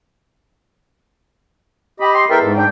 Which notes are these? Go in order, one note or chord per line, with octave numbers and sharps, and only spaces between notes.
G4 D#5 G5 B5
C6
E2 A4 A#4 E5 G5
G#2
D4 G5